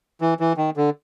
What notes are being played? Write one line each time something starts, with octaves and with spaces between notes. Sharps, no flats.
E3
E3
D#3
D3